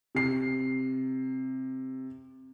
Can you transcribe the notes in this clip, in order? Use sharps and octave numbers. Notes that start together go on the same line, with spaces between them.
C3 C7